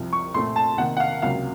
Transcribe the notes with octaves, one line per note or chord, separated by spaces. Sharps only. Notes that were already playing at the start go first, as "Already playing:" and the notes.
Already playing: C2 C3 F3
C#6
A#2 A3 C4 C6
A5
C3 D#3 A#3 D#4 F#5
F#5
F5
C#2 C3 F#3 A#3 F5